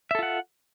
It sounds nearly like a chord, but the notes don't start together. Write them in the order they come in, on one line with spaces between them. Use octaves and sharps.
E5 A4 F4 F#5